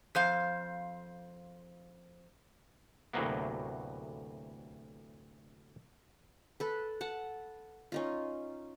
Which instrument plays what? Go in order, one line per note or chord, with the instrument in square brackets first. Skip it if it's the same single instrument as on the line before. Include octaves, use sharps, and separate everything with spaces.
[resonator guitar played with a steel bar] F2 C5 F5
[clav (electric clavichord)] D2 A2 C3 F#3 A#3 B3
[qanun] A4 B4
F#5 A5
C#4 D#4 F4